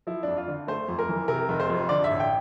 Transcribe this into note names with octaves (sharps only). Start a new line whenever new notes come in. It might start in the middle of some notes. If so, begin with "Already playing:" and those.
F3 E4
F2 D4
F4
D3
A3 C5
F2
A#4
E3
C3 A#4
F1
C5
F2
D3 D5
E5
A1
G5